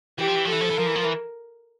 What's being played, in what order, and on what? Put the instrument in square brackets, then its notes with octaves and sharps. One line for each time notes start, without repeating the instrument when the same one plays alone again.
[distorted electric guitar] E3 [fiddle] G4
[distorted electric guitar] F3
E3
F3
[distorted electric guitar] E3 [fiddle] A4
[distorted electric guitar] F3
E3
[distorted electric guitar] F3 [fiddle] A#4
[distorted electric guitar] E3
F3
E3